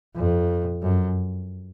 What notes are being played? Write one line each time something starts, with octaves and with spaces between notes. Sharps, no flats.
F2
F#2